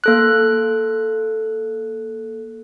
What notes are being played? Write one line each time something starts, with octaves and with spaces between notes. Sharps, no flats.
A#3 A4 F#6